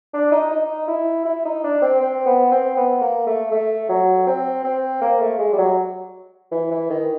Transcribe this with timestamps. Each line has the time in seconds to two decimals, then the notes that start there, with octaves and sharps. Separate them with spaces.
0.14 D4
0.32 D#4
0.51 D#4
0.88 E4
1.25 E4
1.45 D#4
1.64 D4
1.82 C4
2.01 C4
2.26 B3
2.52 C4
2.77 B3
3.01 A#3
3.26 A3
3.51 A3
3.89 F#3
4.27 C4
4.64 C4
5.01 A#3
5.20 A3
5.39 G#3
5.53 G3
5.58 F#3
6.51 E3
6.71 E3
6.90 D#3